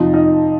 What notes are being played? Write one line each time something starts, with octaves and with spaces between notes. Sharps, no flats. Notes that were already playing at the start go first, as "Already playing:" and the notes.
Already playing: F2 C3 F3 D#4
D#4